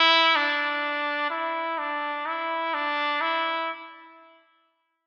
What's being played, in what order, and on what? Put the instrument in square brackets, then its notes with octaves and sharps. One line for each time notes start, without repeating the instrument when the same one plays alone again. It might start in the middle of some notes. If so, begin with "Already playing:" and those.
Already playing: [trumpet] E4
D4
E4
D4
E4
D4
E4